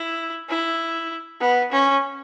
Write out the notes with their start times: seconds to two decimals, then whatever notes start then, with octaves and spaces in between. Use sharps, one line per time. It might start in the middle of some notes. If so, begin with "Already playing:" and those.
Already playing: E4
0.49 E4
1.41 B3
1.72 C#4